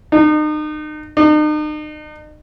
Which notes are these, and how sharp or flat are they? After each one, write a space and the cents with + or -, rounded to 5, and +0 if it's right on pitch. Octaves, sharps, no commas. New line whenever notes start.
D#4 -35
D#4 -40